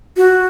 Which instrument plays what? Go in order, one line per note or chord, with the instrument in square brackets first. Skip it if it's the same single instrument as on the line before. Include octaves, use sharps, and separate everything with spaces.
[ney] F#4